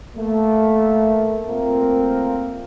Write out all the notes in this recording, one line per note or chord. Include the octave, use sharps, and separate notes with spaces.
A3 A#3
A3 A#3 C4 F4 A#4